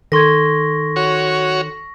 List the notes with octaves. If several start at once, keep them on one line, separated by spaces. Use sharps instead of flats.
D#3 A4 C6 C#6 G#6 A#6
F#4 C#5